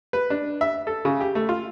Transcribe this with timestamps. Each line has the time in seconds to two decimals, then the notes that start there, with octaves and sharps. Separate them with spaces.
0.13 B4
0.30 D4
0.61 E5
0.87 A4
1.05 C#3
1.21 G4
1.35 A3
1.49 F4